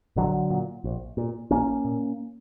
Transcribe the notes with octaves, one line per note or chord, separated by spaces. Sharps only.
A#1 D3 F#3
A#2
A#1
A#2
A#1 A#3 C#4
A#2